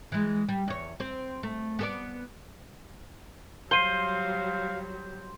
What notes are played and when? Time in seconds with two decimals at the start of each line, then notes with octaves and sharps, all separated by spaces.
0.12 E3 G#3
0.49 G3
0.68 E2 C#5
1.00 C4 C5
1.43 A3
1.79 B3 A4 D5
3.71 F#3 G3 C5 F5 C7 D#7 G7